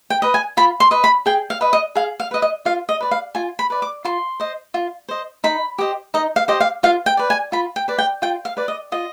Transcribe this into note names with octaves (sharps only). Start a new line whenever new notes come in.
G5
B4 D#5
G#5
F4 B5
C6
B4 D#5
B5
G#4 G5
F5
B4 D#5
D#5
G#4 F5
F5
B4 D#5
D#5
F4 F5
D#5
B4 D5
F5
F4 G#5
B5
B4 D5
D6
F4 C6
C5 D#5
F4
C5 D#5
D#4 B5
G4 C5 D#5
D#4 D#5
F5
G4 C5 D#5
F5
F4 F5
G5
B4 D5
G#5
F4 B5
G5
B4 D5
G5
F4 G5
F5
B4 D5
D#5
F4 D#5